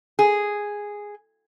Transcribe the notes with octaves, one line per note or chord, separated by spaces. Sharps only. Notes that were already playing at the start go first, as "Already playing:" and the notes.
G#4